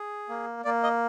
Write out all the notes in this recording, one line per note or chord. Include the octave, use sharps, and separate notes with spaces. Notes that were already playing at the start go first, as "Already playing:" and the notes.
Already playing: G#4
A#3
A#3 D5
D#5